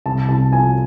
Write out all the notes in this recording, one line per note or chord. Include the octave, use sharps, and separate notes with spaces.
C2 A5
C2 A5
F3 G#5